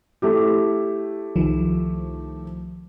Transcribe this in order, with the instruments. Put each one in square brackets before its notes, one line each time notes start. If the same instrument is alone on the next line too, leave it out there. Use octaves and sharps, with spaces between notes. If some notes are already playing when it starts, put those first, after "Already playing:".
[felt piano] A3 E4 G4
[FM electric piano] C2 D#3 F3